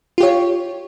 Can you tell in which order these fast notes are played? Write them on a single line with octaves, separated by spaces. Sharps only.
F4 G4 C#5